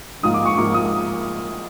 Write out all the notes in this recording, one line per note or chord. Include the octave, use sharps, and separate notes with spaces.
G#2 F3 A#3 D#6
D6
C#6
G#2 F3 A#3 D6
D#6